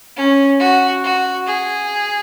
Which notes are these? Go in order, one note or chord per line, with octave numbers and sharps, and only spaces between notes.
C#4
F#4
F#4
G#4